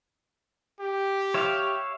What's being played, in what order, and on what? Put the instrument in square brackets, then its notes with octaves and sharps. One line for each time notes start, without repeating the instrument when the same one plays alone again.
[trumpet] G4
[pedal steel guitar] C#5 E5 F5